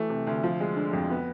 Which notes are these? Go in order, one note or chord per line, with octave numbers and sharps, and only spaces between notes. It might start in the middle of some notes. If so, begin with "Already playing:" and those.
Already playing: E3 A3
C3
D2
F3
G#3
D3
F2
B3